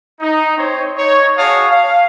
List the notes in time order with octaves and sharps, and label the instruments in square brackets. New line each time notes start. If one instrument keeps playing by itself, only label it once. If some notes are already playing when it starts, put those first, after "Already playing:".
[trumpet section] D#4
C4 C5 C#5
D#4 C#5
F#4 G#4 C#5 F5 A5 D#6
F5